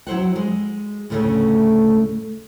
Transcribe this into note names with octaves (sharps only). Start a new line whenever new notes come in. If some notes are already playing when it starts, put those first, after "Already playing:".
F#3 E4 C5 F#5
G#3
D2 A2 C#3 A3 C#5